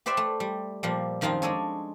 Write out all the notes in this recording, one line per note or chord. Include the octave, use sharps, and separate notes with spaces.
G4 B4 C5 D5 E5 G5
A3
G3
A#2 F3 G3
F#2 D#3 F3 C4 D#4 F4
G#3 D4 A4 C#5 G#5